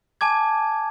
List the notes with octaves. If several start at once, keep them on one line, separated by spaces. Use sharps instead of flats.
G#5 A5 D6 G#6